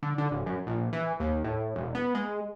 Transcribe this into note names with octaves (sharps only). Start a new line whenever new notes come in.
D3
D3
D1
F#2
A#1
E3
D#2
A2
E1
B3
G#3